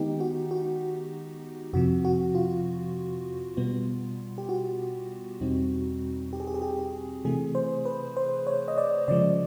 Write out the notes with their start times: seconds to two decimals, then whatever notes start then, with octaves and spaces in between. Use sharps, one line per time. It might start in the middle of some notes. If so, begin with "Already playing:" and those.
Already playing: D#3 G#3 B3 D#4 G4
0.20 F#4
0.51 F#4
1.73 F2 C3 F3 F#4
2.05 F#4
2.35 F4
3.57 B2 G3 B3
4.38 G4
4.49 F#4
5.41 E2 B2 G3 C4 D#4
6.33 G4
6.40 G#4
6.47 G4
6.54 G#4
6.62 G4
6.79 G4
7.25 C3 E3 A3 G#4
7.55 C5
7.85 B4
8.17 C5
8.47 C#5
8.68 D#5
8.78 D5
9.08 C#3 F3 G#3 D5